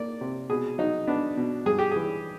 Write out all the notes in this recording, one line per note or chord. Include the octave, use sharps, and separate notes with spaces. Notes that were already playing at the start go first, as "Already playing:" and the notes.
Already playing: A#3 D5
C3
B2 G#4
F#3 D#4
B3 D4
B2
G2 G#4
G4
E3 G#4